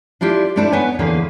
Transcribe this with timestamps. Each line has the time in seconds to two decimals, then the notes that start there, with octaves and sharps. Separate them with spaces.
0.21 D4 E4 F4 G4 D5
0.56 G3 A3 C4 D4 E4 A4
0.72 B3 D#4 B4 C#5 G#5
0.99 E2 D3 A#3 G#4 B4 F5